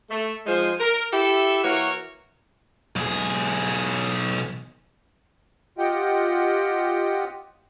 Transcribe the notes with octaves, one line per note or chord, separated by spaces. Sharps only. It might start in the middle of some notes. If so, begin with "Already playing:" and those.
A3
F3 G#3 D#4 C5 G#5
A#4
E4 G4 A4 E5
E3 A#3 F#4 A#4 C#5
B1 G#4
F4 G4 D#5 F#5 G5